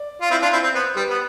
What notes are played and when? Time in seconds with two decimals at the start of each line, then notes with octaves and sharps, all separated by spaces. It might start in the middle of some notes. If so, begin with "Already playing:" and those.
Already playing: D5
0.21 F4
0.31 C4 E4
0.42 D4 F4
0.53 C4 E4
0.64 C4
0.75 B3 C5
0.96 G3 B4
1.10 B3